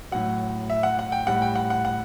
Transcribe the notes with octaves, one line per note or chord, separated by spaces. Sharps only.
A2 F#3 F#5
E5
F#5
F#5
G5
A2 G3 F#5
G5
F#5
F#5
F#5